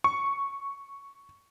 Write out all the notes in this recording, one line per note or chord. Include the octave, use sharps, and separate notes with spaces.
C#6